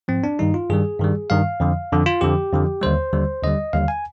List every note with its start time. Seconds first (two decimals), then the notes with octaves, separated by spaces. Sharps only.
0.08 G#2 F3 C4
0.24 D4
0.39 G2 D#3 G3 D#4
0.54 F4
0.70 G2 D#3 G3 G#4
0.99 G2 D#3 G3
1.30 G2 D#3 G3 F5
1.60 F2 D3 F3
1.92 F2 D3 F3
2.06 F4
2.21 F2 D3 F3 G4
2.52 F2 D3 F3
2.82 D#2 D3 G3 C5
3.13 D#2 D3 G3
3.43 D#2 D3 G3 D#5
3.73 D#2 D3 G3 F5
3.88 G#5